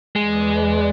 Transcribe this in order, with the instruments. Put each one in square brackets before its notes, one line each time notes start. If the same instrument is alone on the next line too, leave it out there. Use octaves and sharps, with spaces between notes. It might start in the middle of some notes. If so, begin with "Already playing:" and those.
[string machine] E2 B4 D5 [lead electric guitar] G#3